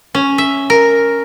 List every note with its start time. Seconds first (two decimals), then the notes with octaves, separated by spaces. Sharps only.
0.15 C#4
0.38 E5
0.70 A#4